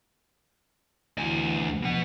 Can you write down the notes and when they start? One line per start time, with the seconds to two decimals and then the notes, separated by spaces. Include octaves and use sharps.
1.18 D2 E3 G#5
1.82 B2 F3 F#5